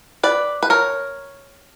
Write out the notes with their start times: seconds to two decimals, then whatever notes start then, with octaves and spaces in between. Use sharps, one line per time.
0.23 B4 D5
0.63 B4
0.70 A#4 C#5